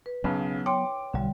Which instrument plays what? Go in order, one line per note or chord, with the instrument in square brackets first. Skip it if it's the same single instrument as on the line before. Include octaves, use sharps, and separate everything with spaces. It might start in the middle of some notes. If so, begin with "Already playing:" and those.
[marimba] B4
[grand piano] B1 C#3 [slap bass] F#3 B3
[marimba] C#5 G5 C6 [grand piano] D6
[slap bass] B1 [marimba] D3 G3